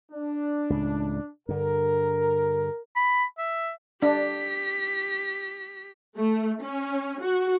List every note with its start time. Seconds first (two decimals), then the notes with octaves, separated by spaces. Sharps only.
0.12 D4
0.70 C#2 A2
1.49 G2 D3 A#4
2.96 B5
3.38 E5
4.02 D4 G4 B6
6.16 A3
6.63 C#4
7.21 F#4